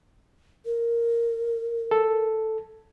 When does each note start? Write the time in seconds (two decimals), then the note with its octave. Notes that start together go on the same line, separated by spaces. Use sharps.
0.65 A#4
1.91 A4